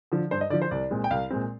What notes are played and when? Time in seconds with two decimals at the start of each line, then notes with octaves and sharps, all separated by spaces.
0.12 D3 F3
0.31 G2 C5
0.41 D#5
0.50 D3 D5
0.53 F3
0.62 C5
0.71 C2 D5
0.91 A#2 G#3 C4
1.04 G5
1.10 C2 F5
1.30 A#2 G#3 C4